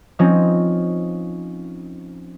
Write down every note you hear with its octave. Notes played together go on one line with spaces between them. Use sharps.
F3 C4 C#4 D#4